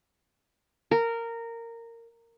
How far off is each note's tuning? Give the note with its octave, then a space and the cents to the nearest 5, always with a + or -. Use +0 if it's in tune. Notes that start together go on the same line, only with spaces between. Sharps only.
A#4 -15